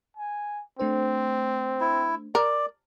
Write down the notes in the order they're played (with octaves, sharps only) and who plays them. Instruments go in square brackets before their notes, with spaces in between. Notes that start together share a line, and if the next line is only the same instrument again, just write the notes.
[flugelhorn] G#5
[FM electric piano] A3 D4 C5 [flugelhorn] C4
[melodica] E4
[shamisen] A#4 [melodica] D5